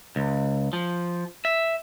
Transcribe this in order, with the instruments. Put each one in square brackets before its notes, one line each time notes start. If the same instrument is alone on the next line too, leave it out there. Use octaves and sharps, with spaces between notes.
[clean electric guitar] C#2
F3
E5